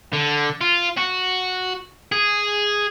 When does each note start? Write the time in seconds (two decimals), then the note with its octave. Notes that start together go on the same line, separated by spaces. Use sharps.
0.13 D3
0.61 F4
0.97 F#4
2.12 G#4